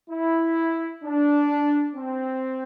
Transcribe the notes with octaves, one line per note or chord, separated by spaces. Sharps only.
E4
D4
C4